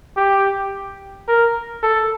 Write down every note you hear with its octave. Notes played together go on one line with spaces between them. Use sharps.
G4
A#4
A4